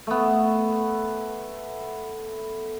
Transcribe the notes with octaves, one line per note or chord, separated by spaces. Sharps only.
A3 B3